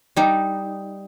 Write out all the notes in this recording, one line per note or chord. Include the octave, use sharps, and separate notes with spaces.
G3 D#4